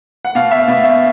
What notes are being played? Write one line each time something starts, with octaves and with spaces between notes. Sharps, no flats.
F#5
B2 F5
E5
B2
E5